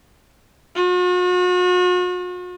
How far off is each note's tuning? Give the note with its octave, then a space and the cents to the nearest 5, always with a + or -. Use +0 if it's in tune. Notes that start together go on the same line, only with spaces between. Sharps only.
F#4 -45